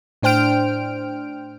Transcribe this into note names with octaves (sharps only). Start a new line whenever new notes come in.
A2 D4 C5 G5 F6 D7